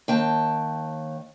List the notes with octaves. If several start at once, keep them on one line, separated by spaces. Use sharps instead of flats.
D#2 G5 A5